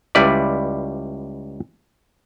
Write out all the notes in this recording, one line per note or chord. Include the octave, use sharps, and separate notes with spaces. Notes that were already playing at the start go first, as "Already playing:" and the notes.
C#2 G3 E4 B4 D5